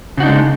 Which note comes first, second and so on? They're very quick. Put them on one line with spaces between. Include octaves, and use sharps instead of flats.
C#3 F#4 D#4 D4 G#3